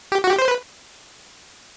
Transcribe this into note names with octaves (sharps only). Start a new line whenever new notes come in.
G4
F#4
G4
C5
B4